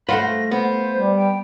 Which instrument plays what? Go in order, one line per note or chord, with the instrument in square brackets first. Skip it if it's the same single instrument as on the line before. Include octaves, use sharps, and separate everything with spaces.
[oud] A3 F4 [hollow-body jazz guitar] B4 C5 F#5 [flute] A#6
[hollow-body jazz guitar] B3 [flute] C5
[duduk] G3
[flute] G5